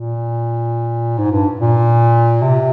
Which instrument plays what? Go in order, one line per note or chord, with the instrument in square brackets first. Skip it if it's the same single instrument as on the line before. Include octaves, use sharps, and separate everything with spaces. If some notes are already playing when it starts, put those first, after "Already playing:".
Already playing: [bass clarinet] A#2
G#2
G2
A#2
C3